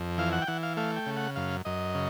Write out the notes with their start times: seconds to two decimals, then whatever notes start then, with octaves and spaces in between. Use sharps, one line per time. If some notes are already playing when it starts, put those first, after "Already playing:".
Already playing: F2
0.18 E3 F5
0.33 F#5
0.42 G5
0.47 E3 F#5
0.63 F5
0.77 A3 F5
0.96 G5
1.06 C#3
1.17 F#5
1.36 F#2 F5
1.65 F#2 D#5
1.95 C#3